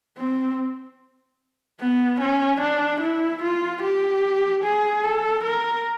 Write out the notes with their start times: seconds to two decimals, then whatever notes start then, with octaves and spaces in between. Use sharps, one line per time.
0.18 C4
1.80 B3
2.21 C#4
2.61 D4
3.01 E4
3.42 F4
3.82 G4
4.64 G#4
5.04 A4
5.44 A#4